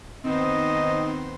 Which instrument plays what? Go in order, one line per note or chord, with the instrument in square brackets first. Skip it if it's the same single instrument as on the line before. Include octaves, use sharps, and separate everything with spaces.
[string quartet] D#3 B3 C5 [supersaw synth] C4 D#4 [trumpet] D#5